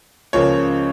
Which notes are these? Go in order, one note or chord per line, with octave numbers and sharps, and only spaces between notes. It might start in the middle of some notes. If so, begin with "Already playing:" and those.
C#2 C#3 F3 A#3 C#4 C#5